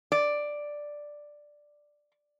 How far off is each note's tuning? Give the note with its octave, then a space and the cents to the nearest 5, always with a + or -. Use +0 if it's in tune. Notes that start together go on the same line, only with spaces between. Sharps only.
D5 +5